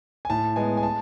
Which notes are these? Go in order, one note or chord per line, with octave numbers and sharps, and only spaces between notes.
G#5
A2 A5
G#3 B3 G#5
G#5
A5